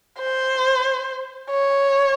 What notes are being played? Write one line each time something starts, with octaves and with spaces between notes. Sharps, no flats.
C5
C#5